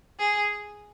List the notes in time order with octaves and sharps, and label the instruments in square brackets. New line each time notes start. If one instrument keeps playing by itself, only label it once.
[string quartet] G#4